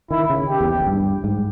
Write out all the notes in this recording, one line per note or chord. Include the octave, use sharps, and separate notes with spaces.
D#3 E4
C#3
G4
E2
E2
G2
G#2